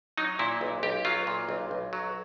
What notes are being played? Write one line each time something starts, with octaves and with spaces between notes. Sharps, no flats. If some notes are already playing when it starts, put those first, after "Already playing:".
F#3 D#4
A#2 E4
B1
B1 G4
F#3 F4
A#2
B1
B1
F#3